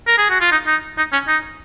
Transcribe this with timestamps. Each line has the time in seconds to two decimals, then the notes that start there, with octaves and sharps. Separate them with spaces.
0.07 A#4
0.18 G#4
0.29 F#4
0.41 F4
0.52 D#4
0.67 D#4
0.98 D#4
1.12 C#4
1.28 D#4